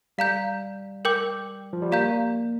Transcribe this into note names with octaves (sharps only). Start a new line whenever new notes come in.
G3 F5 A#5 G6
A#4 G5 D6 G6
F3
G3
A#3 G4 D5 F5 A#5 G6